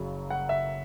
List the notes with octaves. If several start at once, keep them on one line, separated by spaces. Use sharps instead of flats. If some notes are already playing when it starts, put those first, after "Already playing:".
Already playing: F#1 F#2 C#3 F#3
F#5
E5